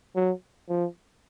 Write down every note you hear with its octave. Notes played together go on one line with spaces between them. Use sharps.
F#3
F3